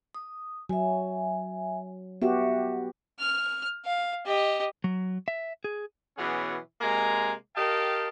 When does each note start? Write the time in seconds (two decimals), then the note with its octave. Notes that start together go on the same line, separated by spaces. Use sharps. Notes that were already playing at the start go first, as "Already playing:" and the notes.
0.15 D#6
0.69 F#3 E5 G#5
2.22 B3 F#4 G4 E5
3.19 F6
3.85 F5
4.26 G4 D#5
4.84 F#3
5.28 E5
5.64 G#4
6.18 B2 E3 F#3 B3 C#4 G#4
6.81 C3 G#3 A#3 G#5 A#5
7.56 G4 A#4 D#5 F5 G5 A5